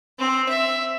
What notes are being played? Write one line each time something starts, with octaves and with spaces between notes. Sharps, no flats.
C4
E5